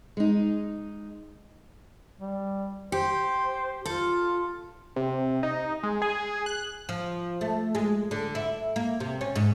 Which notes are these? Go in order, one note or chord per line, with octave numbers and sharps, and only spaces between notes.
G#3 D#4
G3
G4 C5
F4 A4
C3
D#4
G#3
G#4
F#6
F3
A3
G#3
D3
E4
A#3
C3
C#4
G#2